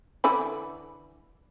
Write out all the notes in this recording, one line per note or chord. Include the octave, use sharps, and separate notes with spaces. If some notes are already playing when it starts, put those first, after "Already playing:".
D3 E3 B5